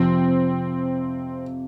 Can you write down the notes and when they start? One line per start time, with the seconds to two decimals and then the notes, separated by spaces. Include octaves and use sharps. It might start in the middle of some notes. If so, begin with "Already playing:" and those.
Already playing: F2 C3 F3 C4